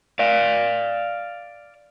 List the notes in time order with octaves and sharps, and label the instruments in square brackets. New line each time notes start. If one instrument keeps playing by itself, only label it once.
[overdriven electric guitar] D5 F5